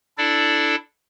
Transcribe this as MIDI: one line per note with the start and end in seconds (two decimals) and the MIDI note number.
0.18 0.76 62
0.18 0.76 64
0.18 0.76 69
0.18 0.76 74